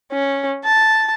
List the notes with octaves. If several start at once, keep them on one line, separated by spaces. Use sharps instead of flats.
C#4
A5